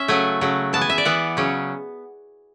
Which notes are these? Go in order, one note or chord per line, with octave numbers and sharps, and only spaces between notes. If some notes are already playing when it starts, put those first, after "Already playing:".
Already playing: C#4 E5
C#3 F#3 A3 G#5
C#3 F#3 A3
E3 B3 A5
G#5
E5
D5
E3 B3 F#5
C#3 F#3 C#4